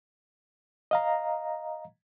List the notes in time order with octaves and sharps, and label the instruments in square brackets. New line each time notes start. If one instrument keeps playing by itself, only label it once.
[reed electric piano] D#5 F5 A#5